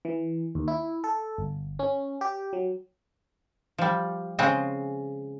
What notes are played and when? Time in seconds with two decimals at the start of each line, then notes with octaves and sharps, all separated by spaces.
0.05 E3
0.55 D#2
0.68 E4
1.04 A4
1.38 G1
1.79 C#4
2.21 G4
2.53 F#3
3.78 F3 G3
4.39 C#3 G#3 C4 D#5